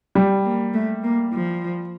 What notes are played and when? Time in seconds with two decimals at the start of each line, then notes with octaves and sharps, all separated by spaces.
0.15 G3
0.45 A#3
0.74 A3
1.04 A#3
1.33 F3